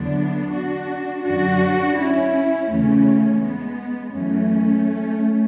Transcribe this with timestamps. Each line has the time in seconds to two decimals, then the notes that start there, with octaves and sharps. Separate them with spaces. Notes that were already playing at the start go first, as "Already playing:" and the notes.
Already playing: E2 D3 F#3 B3 D4
0.52 D4 F#4
1.25 F#2 D3 F#3 D4 F#4
1.97 C#4 E4
2.70 E2 C#3 E3 A3 C#4
3.42 G#3 B3
4.15 F#2 E3 A3 C#4